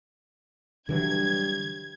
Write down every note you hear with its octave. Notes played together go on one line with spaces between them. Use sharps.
G2 D3 E3 F#3 G#6